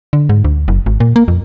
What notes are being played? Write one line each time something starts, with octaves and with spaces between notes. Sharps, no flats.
D3
G#2
D2
F#1
G#1
A#2
A#3
F2